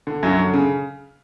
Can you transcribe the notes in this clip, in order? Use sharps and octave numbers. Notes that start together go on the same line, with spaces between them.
D3
F#2 F#3
D3
C#3